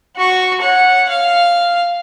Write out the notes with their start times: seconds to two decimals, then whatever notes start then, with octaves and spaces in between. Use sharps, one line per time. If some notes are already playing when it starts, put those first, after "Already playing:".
0.17 F#4 C#6
0.61 C#5 F#5
1.09 F5